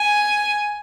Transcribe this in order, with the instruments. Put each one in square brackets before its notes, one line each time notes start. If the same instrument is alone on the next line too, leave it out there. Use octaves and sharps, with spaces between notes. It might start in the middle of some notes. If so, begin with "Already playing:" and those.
Already playing: [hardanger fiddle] G#5